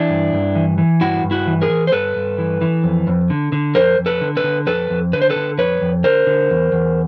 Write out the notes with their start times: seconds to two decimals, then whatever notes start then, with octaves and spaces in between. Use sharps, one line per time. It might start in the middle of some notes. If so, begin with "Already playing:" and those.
Already playing: E3 D4 E4
0.10 G2
0.33 G2
0.56 E3
0.78 E3
1.01 G2 E4 F#4
1.24 G2
1.31 E4 F#4
1.47 E3
1.62 G#4 A#4
1.70 E3
1.87 C5
1.92 G2 A4 B4
2.16 G2
2.38 E3
2.61 E3
2.84 F2
3.07 F2
3.30 D3
3.52 D3
3.75 F2 A#4 C5
3.99 F2
4.06 A4 B4
4.21 D3
4.37 A4 B4
4.44 D3
4.67 F2 A4 B4
4.90 F2
5.13 D3 B4
5.22 C5
5.30 A4 B4
5.36 D3
5.58 F2 B4 C#5
5.81 F2
6.04 D3 A#4 C5
6.27 D3
6.50 E2
6.72 E2